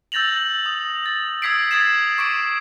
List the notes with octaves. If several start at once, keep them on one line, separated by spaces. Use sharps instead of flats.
E6 G6 A6 A#6 F7 F#7
D#6
A6
D#6 E6 G#6 B6 C7 D7
D#6 G#6 A6 C7 E7
C#6 D6 C7 D7